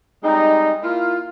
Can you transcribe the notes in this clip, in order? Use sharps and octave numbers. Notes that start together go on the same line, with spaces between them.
G3 G#3 C4 D#4
A#3 E4 F4